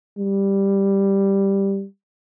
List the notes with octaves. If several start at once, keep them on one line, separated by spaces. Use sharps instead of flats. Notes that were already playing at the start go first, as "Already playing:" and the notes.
G3